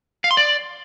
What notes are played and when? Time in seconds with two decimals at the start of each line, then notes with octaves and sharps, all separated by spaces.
0.24 F5
0.31 C6
0.37 D5